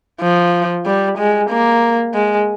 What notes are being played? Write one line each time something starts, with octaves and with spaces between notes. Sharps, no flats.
F3
G3
G#3
A#3
G#3